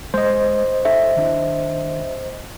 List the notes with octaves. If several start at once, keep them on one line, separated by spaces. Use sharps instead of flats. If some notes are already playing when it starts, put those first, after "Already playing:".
G#3 C5 D#5
D#4 A4 C#5 E5
D#3 D4 E4